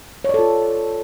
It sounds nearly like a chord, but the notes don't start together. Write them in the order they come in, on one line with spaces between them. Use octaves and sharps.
C#5 D5 A4 F4